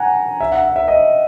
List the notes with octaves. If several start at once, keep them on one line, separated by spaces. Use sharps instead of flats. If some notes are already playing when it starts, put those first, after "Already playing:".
Already playing: F#5 G#5 A#5
E5
F#5
E5
E5
D#5